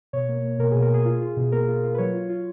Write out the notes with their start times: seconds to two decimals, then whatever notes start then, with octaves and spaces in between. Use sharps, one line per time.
0.13 B2 C#5
0.29 A#3
0.45 A#3
0.59 B2 A#4
0.71 B2 G#4
0.82 A#4
0.91 B2 G#4
1.05 F4
1.21 F4
1.37 B2
1.52 A#3 A#4
1.68 F4
1.84 F4
1.94 B4
1.98 F#3 C#5
2.14 F4
2.29 F4